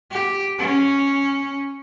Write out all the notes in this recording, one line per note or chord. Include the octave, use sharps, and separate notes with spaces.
G4
C#4